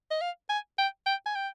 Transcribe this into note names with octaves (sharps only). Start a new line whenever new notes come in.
D#5
F5
G#5
G5
G5
G#5
G5